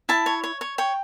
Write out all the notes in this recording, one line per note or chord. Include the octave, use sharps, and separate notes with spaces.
E4 A5
C#5
C#5
C#5
C#5 G5